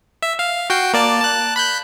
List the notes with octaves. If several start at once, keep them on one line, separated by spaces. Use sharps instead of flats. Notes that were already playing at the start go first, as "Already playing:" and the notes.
E5
F5
F#4 G5 C7
A#3 D5 A5
A5 F#6
B5 F#6 G6